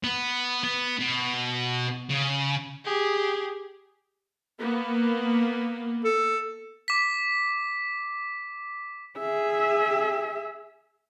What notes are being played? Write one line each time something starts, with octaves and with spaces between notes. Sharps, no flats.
B3
B3
B2
C#3
G4 G#4
A#3 B3
A4
D6 B6
G#4 E5